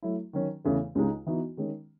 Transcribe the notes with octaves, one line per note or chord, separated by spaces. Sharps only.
F#3 A3 E4
D#3 F#3 C#4
E2 C#3 E3 A3
C#2 C#3 G#3 D#4
E3 B3 D#4 F#4
D#3 G#3 C#4